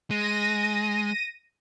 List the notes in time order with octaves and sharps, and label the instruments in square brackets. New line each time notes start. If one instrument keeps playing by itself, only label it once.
[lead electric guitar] G#3 [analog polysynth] A#6 D#7